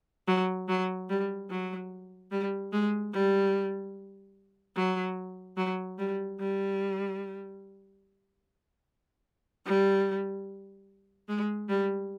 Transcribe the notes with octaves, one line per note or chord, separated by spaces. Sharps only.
F#3
F#3
G3
F#3
G3
G#3
G3
F#3
F#3
G3
G3
G3
G#3
G3